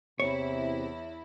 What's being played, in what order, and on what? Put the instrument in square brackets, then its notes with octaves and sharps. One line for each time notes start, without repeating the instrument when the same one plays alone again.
[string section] E2 E4 [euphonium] C3 [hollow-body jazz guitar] C#5